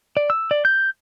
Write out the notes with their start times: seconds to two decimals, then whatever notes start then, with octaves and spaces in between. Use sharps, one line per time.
0.17 D5
0.30 E6
0.51 D5
0.65 G6